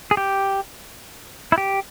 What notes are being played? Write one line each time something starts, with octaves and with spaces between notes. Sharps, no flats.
G#4
G4
E4
G4